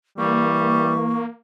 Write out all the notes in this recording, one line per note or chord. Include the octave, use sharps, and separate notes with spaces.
E3 G3 A#3 C#6